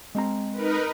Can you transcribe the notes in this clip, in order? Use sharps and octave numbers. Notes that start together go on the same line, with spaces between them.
G#3 C4 A#5
D#4 A#4 B4